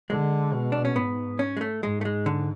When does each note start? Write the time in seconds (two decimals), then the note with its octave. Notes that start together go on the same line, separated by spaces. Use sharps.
0.09 D3 G#3
0.53 B2
0.72 D4
0.85 C#4
0.96 G#2 B3
1.39 C#4
1.57 G#3
1.61 A3
1.83 G#2 G#3
2.01 A3
2.05 G#3
2.26 D3